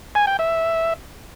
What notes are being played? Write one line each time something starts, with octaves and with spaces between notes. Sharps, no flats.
G#5
G5
E5